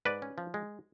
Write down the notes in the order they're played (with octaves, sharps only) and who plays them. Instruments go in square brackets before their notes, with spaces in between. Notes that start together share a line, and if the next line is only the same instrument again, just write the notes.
[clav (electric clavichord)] G#2 B4 D5
C#4
F3
G#3